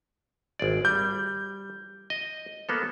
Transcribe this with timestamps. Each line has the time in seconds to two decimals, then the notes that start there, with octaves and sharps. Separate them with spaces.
0.59 G#1 G#4 D5
0.85 G3 G6
2.10 D#5
2.69 A#3 B3 A4